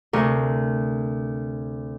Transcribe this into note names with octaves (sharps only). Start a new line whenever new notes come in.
D2 C3 A#4 C#6